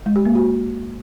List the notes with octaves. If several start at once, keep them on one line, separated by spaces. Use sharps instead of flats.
G#3
G4
A#3
F#4